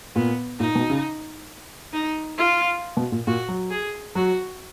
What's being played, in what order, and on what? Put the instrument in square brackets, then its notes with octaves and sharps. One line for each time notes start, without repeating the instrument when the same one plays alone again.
[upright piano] A#2 [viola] B3
[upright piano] A#2 [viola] D#4
[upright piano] B2
C#3
[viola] D#4
F4
[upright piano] B2
A#2
[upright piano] A#2 [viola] F#4
[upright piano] F#3
[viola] G#4
[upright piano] F#3 [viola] F#4